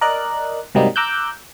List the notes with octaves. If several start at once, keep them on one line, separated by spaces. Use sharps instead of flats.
A#4 D5 D#5 F#6
G#2 C3 F#3 G3 A#3 D#4
A#5 D6 E6 F#6 G6